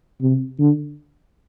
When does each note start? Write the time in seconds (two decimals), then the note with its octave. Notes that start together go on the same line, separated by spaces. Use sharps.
0.21 C3
0.59 D3